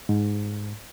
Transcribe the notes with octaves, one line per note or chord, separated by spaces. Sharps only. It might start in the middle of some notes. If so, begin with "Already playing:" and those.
G#2